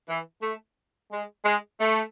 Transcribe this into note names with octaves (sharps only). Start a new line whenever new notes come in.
E3
A3
G#3
G#3
A3